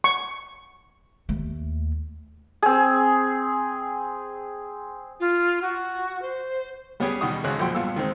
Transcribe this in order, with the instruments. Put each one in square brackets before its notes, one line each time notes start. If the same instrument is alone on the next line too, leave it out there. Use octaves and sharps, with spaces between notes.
[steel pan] C#6
[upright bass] D#2 A3
[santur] C4 G#4
[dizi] F4
F#4
C5
[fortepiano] G3 B3 C#4 G4 G#4
B2 D#3 G3 F#4 C#6 D#6
G#1 C#3 F#6
B1 F2 A#2 F#4 G5 C6
G2 A#2 B3 F5 E6
D#3 G#3 C4